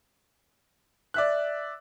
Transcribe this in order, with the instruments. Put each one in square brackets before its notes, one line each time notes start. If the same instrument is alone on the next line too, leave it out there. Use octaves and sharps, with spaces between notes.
[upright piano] D5 E5 F#6